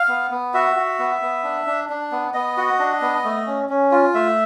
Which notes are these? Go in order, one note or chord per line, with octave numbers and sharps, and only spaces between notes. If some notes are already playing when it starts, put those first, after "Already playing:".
Already playing: F5
B3
B3
F#4 E5
F#4
B3
B3
D4
D4
D4
B3
B3 D#5
F#4
D4
B3
A3
C#4
C#4
F4
A3 E5